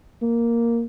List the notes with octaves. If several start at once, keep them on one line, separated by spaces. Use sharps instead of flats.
A#3